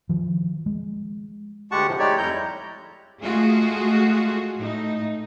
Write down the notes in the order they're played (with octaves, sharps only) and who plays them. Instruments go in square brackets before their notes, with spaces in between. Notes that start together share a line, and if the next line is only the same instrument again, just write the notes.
[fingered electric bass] D#3 F3
G#3
[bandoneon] D2 G#3 G4 F#5 A5 C#6
A2 C3 F3
G#3 A3 D#4 G4 C#5 D5
F2 G3 E4 A#5 G6
[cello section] G#3 A3 F4 F#4 G#4
A2 A3 D#4